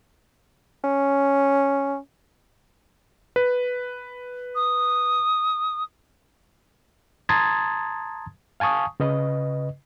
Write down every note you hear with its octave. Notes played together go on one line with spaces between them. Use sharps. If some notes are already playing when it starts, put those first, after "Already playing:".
C#4
B4
D#6
A5 A#5 C6 D#6 G#6 A6
F5 G#5 A5 C#6 D#6
C#3 B4 D#5